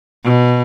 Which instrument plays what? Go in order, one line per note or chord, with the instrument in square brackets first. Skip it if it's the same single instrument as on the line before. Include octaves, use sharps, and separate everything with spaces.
[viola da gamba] B2